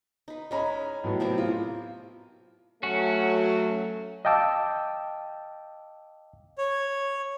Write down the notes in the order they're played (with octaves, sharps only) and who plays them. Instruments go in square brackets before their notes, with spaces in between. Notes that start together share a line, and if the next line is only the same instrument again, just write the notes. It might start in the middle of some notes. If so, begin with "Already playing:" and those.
[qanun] D#4 B4
[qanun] G#3 C#4 [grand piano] D#5 A#5 B5
[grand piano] A2 F#3 B3
[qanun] C3 F3 A#3
[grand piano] F4
[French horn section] F#3 A3 [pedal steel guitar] C#4 F#4
[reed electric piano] D#5 F5 G5 A5 D6 E6
[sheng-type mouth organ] C#5